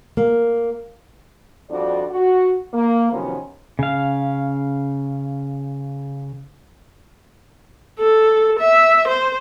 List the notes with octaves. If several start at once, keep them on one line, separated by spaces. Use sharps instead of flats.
A#3
F2 G3 D4 F#4 D5
F#4
A#3
C3 D#3 F3 F#3 B3 C#4
C#3 F5
A4
E5
C5